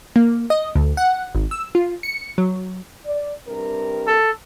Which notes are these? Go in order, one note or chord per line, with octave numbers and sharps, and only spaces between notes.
A#3
D#5
D2
F#5
G#1
E6
F4
C#7
F#3
D5
G2 C3 A#4
A4